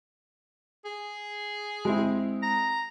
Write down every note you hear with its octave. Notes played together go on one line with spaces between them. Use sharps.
G#4
G#3 C4 E4
A#5